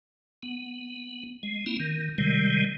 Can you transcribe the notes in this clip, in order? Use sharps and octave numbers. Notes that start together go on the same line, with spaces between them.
B3
G#3
A#3 C4 E4
D#3
C3 D#3 G3 G#3